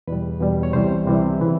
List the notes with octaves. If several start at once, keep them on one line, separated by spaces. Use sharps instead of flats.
E2 B2 G3 B4
E2 B2 G3
C#5
C2 C3 E3 G3 C5
C2 C3 E3 G3
C#3 E3